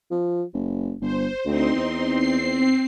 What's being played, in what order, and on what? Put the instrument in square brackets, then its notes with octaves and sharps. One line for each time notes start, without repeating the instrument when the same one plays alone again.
[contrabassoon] F3
F#1
[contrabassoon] G1 [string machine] C5
[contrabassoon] D2 [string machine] C4 D#4 C6
[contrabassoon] E2
[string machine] C4 C7